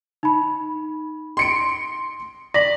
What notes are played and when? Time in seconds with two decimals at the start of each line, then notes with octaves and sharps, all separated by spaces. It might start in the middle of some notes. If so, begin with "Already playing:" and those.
0.23 D#4 B5
1.37 C6 C#7 D7
2.54 D5 A#6 B6 F#7